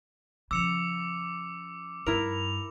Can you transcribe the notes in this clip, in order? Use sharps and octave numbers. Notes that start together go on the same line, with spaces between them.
C#3 F3 D6 E6 C#7 F7
G2 E4 A#4 F7